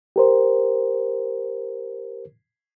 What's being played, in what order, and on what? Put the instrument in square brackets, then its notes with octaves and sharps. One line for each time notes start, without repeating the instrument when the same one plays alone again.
[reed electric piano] G4 A#4 C5